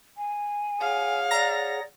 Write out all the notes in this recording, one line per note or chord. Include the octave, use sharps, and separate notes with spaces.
G#5
G#4 C#5 F5 F#5
D5 A#5 A#6